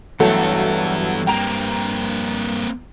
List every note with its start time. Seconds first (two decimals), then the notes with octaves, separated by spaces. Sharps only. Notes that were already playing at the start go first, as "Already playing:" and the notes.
0.20 G2 E3 F#3 A3 B3 A4
1.27 A#3 C4 G5 A#5 F7